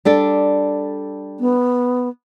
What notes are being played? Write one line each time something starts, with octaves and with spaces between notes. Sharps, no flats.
G3 D4 A4
B3